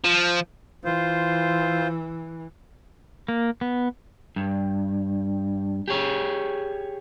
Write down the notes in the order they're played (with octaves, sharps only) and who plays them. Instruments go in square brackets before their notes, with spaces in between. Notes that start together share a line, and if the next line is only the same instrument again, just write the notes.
[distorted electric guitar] F3
[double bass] E3 [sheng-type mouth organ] F4 C5
[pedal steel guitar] A#3
B3
[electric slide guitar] G2
G4 G#4 C#5